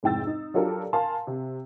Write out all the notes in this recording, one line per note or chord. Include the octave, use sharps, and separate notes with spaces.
F1 G#2 E4 G5 E6 A6
D#4
F#3 D4 F4 G4 A4 A#4
A#4 F5 G#5 A5 C6
C3